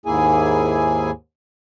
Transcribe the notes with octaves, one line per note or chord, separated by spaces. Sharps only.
D#2 G#2 A#3 E4 G#4 G#5